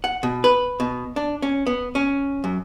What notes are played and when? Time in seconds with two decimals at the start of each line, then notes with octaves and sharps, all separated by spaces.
0.04 F#5
0.23 B2
0.44 B4
0.80 B2
1.16 D4
1.42 C#4
1.67 B3
1.95 C#4
2.44 F#2